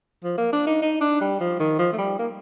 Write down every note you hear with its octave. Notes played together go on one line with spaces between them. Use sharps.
F3
A#3
D4
D#4
D#4
D4
G3
F3
D#3
F3
A3
G3
A#3